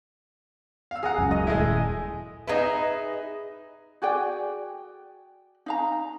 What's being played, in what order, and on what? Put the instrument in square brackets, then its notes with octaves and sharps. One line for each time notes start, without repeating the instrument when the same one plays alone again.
[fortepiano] F5 E6
[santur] G#4 A#5 [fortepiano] F5 F#5
[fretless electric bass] C#2 F#2
[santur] D#5
[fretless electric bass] D#1 [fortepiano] G#3 A3 E4
[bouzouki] D#4 G#4 E5 [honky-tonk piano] B4 D#5
[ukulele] F#4 G#4 D5 G5
D#4 F5 A#5